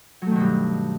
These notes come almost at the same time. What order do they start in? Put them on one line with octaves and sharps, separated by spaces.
F#3 A3 D#3 B2 G2